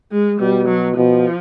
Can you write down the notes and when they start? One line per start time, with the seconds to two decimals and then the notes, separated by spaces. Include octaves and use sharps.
0.12 G#3
0.40 B2 G3
0.68 F#3
0.96 B2 F3